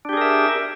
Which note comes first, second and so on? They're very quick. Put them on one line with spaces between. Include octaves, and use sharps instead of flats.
D4 G4 G#4 A#4 E5